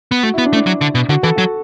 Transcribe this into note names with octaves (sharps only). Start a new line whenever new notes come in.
B3
A3 F#4
B3 E4
D4
A3
D4
F#3
D3
B2
D3 F#4
E3 A4
F#3 F#4